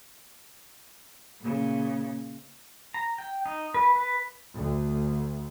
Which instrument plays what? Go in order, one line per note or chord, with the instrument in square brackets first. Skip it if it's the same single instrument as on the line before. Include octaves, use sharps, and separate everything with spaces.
[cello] A#2 C#3
[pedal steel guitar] A#5
G5
D#4
B4
B4
[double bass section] D2